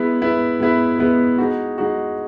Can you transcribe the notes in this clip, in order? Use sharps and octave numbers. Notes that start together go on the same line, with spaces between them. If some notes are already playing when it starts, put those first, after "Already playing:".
Already playing: G#3 B3 E4 B4
G#3 B3 E4 B4
G#3 B3 E4 B4
G#3 B3 E4 B4
G#3 D#4 F#4
G#3 D#4 F#4